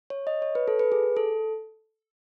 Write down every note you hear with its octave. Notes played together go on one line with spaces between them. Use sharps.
C#5
D#5
C#5
B4
A4
B4
G#4
A4